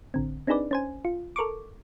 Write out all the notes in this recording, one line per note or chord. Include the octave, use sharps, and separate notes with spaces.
A1 D3 C4
C4 D4 D#4 G#4 B4 D5
C#4 C5 G#5
F4
A4 A#4 C#6 D6